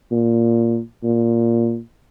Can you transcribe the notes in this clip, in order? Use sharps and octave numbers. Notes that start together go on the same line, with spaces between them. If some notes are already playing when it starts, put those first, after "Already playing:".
A#2
A#2